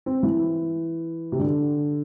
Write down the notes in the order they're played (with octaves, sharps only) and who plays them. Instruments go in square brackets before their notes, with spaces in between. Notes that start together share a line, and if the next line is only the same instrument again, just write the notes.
[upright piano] C4
E3
C3
D3